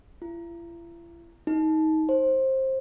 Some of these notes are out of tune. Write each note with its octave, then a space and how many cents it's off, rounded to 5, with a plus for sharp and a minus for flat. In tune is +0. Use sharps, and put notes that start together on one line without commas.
E4 +45
D#4 +20
C5 +20